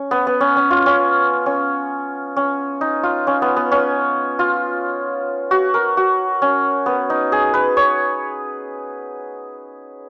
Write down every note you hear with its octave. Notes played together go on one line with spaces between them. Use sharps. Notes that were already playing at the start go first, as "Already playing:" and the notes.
Already playing: C#4
B3
B3
C#4
C#4
F4
C#4
C#4
C#4
D#4
F4
C#4
B3
B3
C#4
F4
F#4
A#4
F#4
C#4
B3
D#4
G#4
B4
C#5